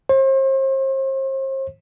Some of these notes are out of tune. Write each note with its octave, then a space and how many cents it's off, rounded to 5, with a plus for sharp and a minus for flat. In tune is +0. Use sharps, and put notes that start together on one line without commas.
C5 +40